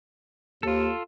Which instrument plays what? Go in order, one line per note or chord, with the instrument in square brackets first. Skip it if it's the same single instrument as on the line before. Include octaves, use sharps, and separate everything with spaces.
[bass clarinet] D#2 [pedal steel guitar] F4 A4